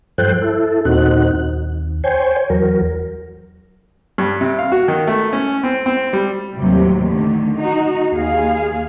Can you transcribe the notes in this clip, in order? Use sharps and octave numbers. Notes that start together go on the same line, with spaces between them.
G2 F3 A4 C5 G5 F#6
E4 A4
D#2 A#2 C4 D#4 F#4 F#6
D#2
C5 C#5 G5 G#5
E2 F#3 A#4
G2
C3
F5
F#4
D#3
A3
C#4
C4
C4
G3
D#2 A2 C3 F#3 G3
D3 D#3 A3
D#4 F#4
D#2 G#4 F5